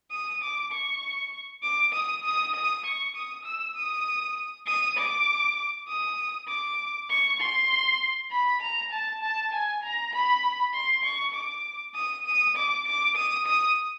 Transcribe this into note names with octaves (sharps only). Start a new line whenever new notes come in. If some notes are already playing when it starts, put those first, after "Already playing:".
D#6
D6
C#6
D6
D#6
D#6
D#6
C#6
D#6
E6
D#6
D#6
D6
D#6
D6
C#6
C6
B5
A#5
A5
A5
G#5
A#5
B5
C6
C#6
D6
D#6
D#6
D6
D6
D#6
D#6